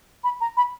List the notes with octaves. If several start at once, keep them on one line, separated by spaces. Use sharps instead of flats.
B5
A#5
B5